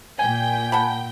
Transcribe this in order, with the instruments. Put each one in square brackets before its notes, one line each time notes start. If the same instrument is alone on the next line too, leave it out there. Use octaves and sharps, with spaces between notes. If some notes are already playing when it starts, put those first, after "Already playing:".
[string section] A#2 G5 [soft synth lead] G#5
[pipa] F#5 A5 B5